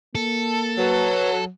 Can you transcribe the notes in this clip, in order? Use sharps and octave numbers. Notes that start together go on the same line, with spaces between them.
A#3 A4
F#3 B4